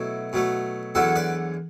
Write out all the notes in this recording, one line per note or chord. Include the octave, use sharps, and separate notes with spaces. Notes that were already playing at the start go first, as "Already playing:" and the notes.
Already playing: B2 F#3 A3 E4
B2 F#3 A3
E2 D3 F#3 F#4 A4
B4 D5